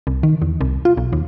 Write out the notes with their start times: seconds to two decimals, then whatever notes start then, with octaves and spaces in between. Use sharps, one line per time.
0.07 C2
0.23 D#3
0.42 E2
0.61 C2
0.85 F4
0.97 B1
1.13 D#2